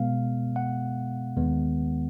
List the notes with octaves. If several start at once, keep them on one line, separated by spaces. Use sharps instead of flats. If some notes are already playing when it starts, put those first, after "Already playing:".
Already playing: B2 G#3 B3 F5
F#5
D#2 D#3 G#3 B3